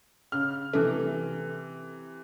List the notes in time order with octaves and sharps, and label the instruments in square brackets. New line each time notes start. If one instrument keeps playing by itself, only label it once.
[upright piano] C#3 F6
[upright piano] C3 E3 [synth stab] A3